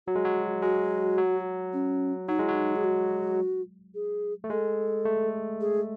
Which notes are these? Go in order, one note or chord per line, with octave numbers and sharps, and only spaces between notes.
F#3 F#4
G#3
F#3
G#3 F#4
F#3
C#4
F#3 D#4
G#3 E4
F#3 D#4
G#4
F#4
G#4
A3
G#3 A4
A3
G#4